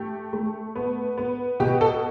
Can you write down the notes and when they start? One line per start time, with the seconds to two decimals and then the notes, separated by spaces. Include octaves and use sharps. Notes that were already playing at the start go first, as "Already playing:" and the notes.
Already playing: A3 G4
0.33 A3
0.76 B3
1.18 B3
1.60 B2 G4
1.81 A4